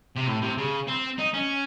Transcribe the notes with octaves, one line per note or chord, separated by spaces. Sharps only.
C3
A2
C3
C#3
C4
D#4
C#4